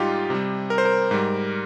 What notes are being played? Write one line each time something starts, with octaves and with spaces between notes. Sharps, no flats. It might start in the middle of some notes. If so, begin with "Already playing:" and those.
Already playing: G#2 G3 D#4 F4 G4
C3 G3
A#4
C5
A#4
G#2 G3